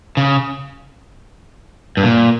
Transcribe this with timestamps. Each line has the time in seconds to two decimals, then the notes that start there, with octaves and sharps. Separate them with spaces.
0.17 C#3
1.97 G2
2.03 A#2